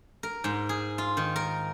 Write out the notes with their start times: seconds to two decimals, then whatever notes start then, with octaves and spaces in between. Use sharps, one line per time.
0.23 A#4
0.44 G#2
0.69 G#4
0.98 F4
1.17 D#3
1.36 A#4